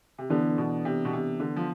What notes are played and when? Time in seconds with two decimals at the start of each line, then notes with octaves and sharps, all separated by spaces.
0.18 C3
0.30 D3 E3 B3 D4 A4
0.58 B2
0.85 C3
1.05 B2
1.13 C3
1.40 D3
1.56 F3